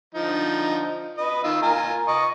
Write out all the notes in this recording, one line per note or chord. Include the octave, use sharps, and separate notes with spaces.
D3 F3 D#4
B4 D#5
D#3 F4 E6
F4 A#4 G#5
D#5 C#6